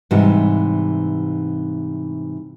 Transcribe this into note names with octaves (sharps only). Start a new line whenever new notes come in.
G#2 C3 E3 G3 G4